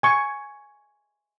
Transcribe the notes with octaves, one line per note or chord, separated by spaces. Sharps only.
G#5 C#6